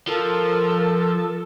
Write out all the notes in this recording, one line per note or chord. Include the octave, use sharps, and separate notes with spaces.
F3 A4 A#4